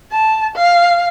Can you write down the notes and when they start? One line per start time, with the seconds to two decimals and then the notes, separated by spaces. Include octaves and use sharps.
0.12 A5
0.56 F5